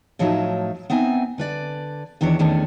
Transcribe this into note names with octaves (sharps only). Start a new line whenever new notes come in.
A2 F3 F#3 D#4 E5
B3 C4 D#4 E5 G#5
D3 B4 D5
E2 D#3 E3 D4 C#5
E2 D#3 A3 C#4 D4